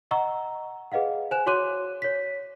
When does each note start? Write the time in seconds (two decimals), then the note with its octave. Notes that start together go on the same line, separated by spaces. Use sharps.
0.11 D#5 F#5 A#5 C#6 E6
0.92 G#4 B4 D#5 F5 F#5
1.31 C5 G#5 F#6 E7
1.46 F#4 C#5 C6 D6 F#6 D#7
2.02 C#5 B6